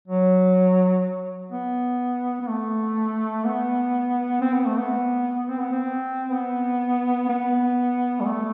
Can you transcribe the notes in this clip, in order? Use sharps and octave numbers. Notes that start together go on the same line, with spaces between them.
F#3
B3
B3
A3
B3
C4
B3
A3
B3
C4
B3
C4
B3
B3
G3
A3